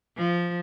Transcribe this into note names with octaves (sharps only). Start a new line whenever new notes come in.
F3